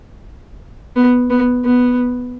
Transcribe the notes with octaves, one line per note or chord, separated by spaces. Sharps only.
B3
B3
B3